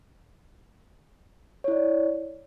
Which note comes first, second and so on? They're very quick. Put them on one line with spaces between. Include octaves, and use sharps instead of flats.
C#5 E4 D5